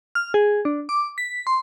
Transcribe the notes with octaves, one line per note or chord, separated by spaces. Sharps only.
F6
G#4
D4
D6
B6
C6